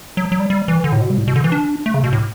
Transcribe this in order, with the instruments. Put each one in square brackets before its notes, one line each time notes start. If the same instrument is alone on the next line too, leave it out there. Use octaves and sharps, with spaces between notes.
[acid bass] F#3
F#3
G3
G3
E3
D3
A2
B2
G3
A2
B2
D3
E3
D4
A3
C#3
B2
A2